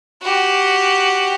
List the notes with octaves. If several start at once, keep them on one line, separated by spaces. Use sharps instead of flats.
F#4 G4